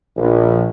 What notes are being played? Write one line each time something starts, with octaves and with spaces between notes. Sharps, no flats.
A#1